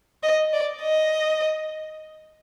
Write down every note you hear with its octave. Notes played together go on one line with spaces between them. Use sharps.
D#5
D5
D#5